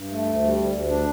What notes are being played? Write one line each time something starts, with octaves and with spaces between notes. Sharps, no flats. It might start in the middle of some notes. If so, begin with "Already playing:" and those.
Already playing: G2
A3
D2
G3
D2
D2
D4